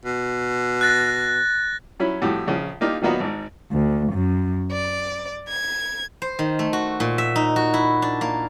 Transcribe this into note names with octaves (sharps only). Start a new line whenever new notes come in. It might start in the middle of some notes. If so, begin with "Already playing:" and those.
B2
F#6 A6 A#6
F#3 C#4 E4 B5
F2 A2 F#4 G4
A#1 C#3 F3
A#3 D4 D#4 F4 G4
D#3 F#3 A#3 B3 D#4 F#4
G#1 G#2
D2
F#2
D5
G#6
C5
D#3
A3
F#4
A#2
E5
D#4
F#4
E4
D4
A#3